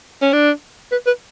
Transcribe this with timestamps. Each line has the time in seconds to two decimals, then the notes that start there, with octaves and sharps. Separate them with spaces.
0.21 C#4
0.33 D4
0.92 B4
1.07 B4